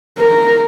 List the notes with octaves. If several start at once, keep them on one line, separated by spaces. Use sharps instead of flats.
A#4